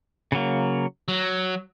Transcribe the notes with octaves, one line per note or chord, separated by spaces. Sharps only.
C#3 F#3 A#3
F#3